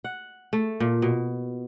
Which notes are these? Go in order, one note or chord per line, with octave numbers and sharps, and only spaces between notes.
F#5
A3
A#2
B2